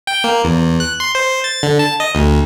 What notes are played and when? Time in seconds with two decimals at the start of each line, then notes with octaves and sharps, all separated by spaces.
0.07 G5
0.24 A#3
0.44 E2
0.80 F#6
1.00 C6
1.15 C5
1.44 A6
1.63 D3
1.79 A5
2.00 D#5
2.15 D2